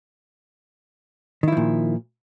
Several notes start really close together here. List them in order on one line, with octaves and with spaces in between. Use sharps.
D#3 E4 F3 A#2